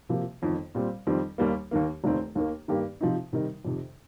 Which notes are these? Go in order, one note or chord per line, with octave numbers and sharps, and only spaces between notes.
C3 F3 A#3
G1 F2 D#3
A#2 G3 C4
F2 D#3 G3 C4
D#2 D#3 G3 A#3
D#2 D#3 A#3
F1 D#2 D#3 C4
D#2 D#3 A#3
G2 D#3 A#3 G4
C3 F3 C4 D#4
C3 D#3 G3 D#4 A#4
F2 C3 D#3